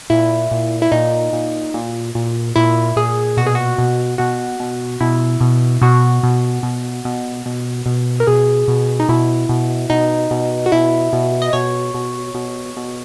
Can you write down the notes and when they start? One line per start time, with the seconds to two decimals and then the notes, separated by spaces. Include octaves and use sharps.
0.10 A#2 E4
0.51 A#2
0.82 E4
0.92 A#2 D#4
1.33 A#2
1.74 A#2
2.15 A#2
2.56 A#2 E4
2.96 A#2 G#4
3.37 B2 F#4
3.46 G#4
3.55 F#4
3.78 B2
4.18 B2 F#4
4.60 B2
5.00 B2 E4
5.41 B2
5.81 B2 F#4
6.23 B2
6.63 B2
7.05 B2
7.46 B2
7.86 B2
8.20 A#4
8.27 B2 G#4
8.68 B2
9.00 D#4
9.09 B2 E4
9.49 B2
9.90 B2 D#4
10.31 B2
10.66 F#4
10.72 B2 E4
11.13 B2
11.42 D#5
11.53 B2 C#5
11.94 B2
12.35 B2
12.77 B2